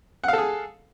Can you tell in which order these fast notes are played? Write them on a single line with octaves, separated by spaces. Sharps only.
F#5 F5 A4 G#4